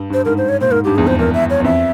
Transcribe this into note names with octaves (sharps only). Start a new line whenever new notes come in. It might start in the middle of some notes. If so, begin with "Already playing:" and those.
Already playing: G2
G2 C5
G#2 A#4
C5
C#5
A#2 C5
G#2 A#4
G2 G4
E2 G#4
F2 C5
E2 A#4
E5
C#5
E2
F2 E5